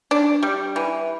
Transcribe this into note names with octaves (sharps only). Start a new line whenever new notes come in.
D4
G3
E3